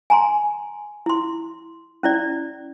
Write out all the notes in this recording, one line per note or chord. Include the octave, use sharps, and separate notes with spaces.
G#5 A#5 C6
E4 C6
C#4 E4 D5